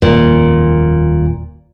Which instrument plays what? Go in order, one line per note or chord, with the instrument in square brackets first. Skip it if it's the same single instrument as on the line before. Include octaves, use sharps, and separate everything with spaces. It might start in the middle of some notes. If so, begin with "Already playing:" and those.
[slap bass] D#1 F2 [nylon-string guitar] A#2